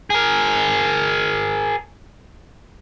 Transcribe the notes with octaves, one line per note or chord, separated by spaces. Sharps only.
G#4 A#4